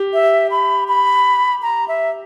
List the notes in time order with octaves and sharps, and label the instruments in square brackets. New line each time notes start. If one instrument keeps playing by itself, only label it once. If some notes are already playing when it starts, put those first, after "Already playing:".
Already playing: [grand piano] G4
[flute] E5
B5
B5
A#5
E5